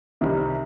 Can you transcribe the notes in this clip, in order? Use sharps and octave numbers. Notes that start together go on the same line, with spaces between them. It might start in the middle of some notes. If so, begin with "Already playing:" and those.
C2 C3 D#3 G3